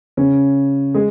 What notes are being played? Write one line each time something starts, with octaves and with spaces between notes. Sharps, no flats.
C#3 C#4
G#3 G#4